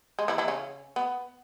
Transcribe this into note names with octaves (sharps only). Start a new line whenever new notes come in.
G#3
E3 E4
E3 E4
C#3 C#4
B3